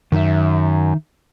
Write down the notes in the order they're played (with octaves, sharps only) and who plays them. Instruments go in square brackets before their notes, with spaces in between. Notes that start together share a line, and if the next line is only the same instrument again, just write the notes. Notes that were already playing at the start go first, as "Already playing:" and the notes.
[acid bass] F#2 [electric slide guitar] D#3 D#4 E5